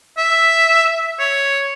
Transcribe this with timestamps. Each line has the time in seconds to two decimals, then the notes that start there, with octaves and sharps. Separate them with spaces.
0.18 E5
1.19 C#5